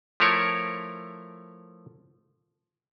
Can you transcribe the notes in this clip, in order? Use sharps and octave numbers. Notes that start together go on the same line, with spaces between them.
F3 A3 E4 A#4 C#5